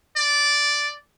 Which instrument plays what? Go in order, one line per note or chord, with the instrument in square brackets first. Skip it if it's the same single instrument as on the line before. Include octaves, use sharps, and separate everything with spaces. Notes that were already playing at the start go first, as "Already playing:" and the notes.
[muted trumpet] D5